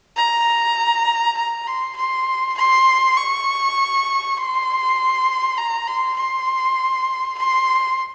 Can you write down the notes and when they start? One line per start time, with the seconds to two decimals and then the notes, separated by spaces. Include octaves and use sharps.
0.16 A#5
1.37 A#5
1.67 C6
1.96 C6
2.58 C6
3.17 C#6
4.37 C6
5.57 A#5
5.87 C6
6.17 C6
7.38 C6